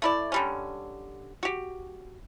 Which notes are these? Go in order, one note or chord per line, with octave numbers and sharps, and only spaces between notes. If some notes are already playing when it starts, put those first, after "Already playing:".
A3 E4 D5
D3 G3 C#4
F#4 G4